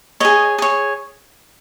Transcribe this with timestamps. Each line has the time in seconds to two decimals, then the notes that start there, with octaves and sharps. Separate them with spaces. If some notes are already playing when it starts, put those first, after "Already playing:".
0.20 G#4 C#5 D#5
0.58 G#4 C#5